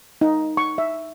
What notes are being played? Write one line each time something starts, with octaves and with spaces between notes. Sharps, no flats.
D#4
C#6
E5